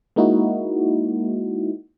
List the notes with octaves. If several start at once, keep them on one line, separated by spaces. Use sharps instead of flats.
G#3 A#3 D#4 E4 F#4